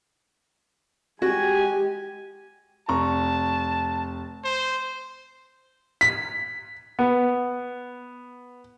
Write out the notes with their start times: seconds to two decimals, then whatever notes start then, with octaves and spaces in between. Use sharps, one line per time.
1.22 G#3 F#4 G4 G#5
2.88 F1 A5 A#5 C#6
4.44 C5
6.01 B6
6.99 B3